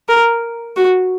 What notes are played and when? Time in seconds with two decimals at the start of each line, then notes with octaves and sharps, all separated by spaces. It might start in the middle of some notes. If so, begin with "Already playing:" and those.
0.08 A#4
0.76 F#4